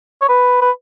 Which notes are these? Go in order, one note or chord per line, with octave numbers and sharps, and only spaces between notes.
C#5
B4
B4